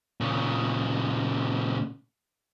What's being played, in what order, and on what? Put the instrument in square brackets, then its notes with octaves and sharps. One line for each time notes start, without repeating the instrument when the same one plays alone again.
[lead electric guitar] A#2 C#3